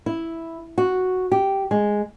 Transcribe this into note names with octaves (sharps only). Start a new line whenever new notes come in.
E4
F#4
G4
G#3